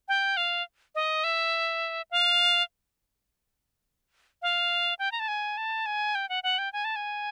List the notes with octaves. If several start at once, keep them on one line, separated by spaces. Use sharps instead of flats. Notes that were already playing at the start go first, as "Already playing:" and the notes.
G5
F5
D#5
E5
F5
F5
G5
A#5
A5
G#5
A5
G#5
G5
F#5
F#5
G5
G#5
A5
G#5